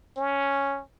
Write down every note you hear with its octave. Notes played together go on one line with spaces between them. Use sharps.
C#4